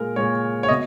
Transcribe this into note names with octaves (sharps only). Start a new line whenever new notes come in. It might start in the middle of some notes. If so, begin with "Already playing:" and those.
Already playing: A#2 G#3 A#4
A#2 G#3 C#5
C#5
B2 D#5